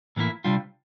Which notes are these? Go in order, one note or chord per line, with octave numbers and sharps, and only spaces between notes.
A2 E3 A#3 E4
C3 G3 D4 F4